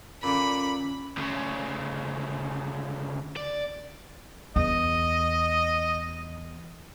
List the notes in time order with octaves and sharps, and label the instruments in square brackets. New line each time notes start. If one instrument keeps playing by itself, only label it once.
[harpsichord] A#2 D3 [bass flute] C#4 [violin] B5
[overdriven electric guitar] D2 C#3
D5
[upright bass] E2 [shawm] D#5